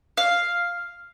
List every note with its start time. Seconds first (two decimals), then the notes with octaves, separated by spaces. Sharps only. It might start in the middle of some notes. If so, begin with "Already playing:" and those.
0.17 F5